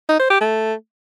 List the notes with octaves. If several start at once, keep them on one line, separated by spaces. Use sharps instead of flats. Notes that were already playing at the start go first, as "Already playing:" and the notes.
D#4
C5
G4
A3